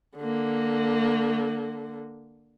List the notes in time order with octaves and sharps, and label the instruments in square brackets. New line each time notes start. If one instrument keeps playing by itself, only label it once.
[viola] D3 A#3